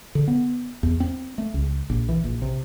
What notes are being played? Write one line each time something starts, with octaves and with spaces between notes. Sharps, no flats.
D3
B3
E2
C4
A3
C#2
A#1
E3
A#1
C3